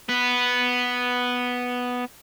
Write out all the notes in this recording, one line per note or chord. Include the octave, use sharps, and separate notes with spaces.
B3 B4